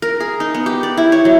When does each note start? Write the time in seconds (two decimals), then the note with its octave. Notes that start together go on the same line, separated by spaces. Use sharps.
0.02 A#4
0.20 G#4
0.40 D#4
0.54 B3
0.66 G4
0.83 D5
0.97 E4
1.12 C#5
1.25 F#3